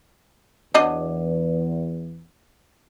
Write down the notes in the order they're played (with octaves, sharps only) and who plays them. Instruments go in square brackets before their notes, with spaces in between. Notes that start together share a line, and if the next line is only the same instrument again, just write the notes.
[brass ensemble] E2 [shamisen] F#3 D4 D#5